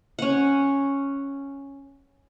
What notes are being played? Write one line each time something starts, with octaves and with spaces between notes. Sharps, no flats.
C#4 F#5